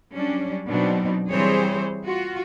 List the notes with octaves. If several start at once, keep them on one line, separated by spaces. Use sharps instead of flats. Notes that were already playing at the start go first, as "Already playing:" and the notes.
F#3 G3 C#4 D4
B2 F#3 C4 D4 D#4
E3 G3 C4 G#4 C5 C#5
F4 F#4